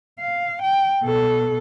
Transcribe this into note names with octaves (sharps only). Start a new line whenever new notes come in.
F5
G5
B2 A4